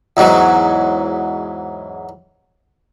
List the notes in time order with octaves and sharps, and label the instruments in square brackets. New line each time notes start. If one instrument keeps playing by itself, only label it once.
[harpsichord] E2 G#2 F#3